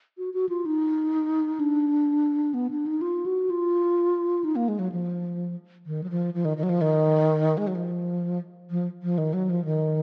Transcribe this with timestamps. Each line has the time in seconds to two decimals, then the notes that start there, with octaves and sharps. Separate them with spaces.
0.18 F#4
0.34 F#4
0.49 F4
0.66 D#4
1.60 D4
2.54 B3
2.71 D4
2.86 D#4
3.01 F4
3.26 F#4
3.50 F4
4.44 D#4
4.56 A#3
4.68 G#3
4.79 F#3
4.92 F3
5.86 D#3
6.04 F#3
6.10 F3
6.34 F3
6.45 D#3
6.57 D#3
6.63 F#3
6.69 F3
6.81 D#3
7.58 G#3
7.67 F#3
7.75 F3
8.71 F3
9.03 F3
9.18 D#3
9.33 F#3
9.50 F3
9.65 D#3